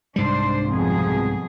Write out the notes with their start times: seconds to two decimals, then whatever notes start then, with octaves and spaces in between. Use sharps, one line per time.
0.16 C2 G#2 G3 D4 C5
0.69 F2 B2 G#4